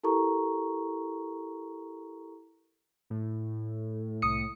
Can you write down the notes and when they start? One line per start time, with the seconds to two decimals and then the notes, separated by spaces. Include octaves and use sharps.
0.03 E4 G4 A4 A#4 A#5 C#6
3.10 A2
4.22 C2 D#6 C#7